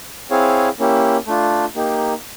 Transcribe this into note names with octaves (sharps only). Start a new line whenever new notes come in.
C4 E4 G#4 C#5 F5
A#3 C#4 E4 G4
A3 D4 F4
A#3 D#4 G4